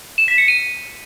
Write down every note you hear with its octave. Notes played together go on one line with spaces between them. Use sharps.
E7
B6
C#7
D#7